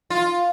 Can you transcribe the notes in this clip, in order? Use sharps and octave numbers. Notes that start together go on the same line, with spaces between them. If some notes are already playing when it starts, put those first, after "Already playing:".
F4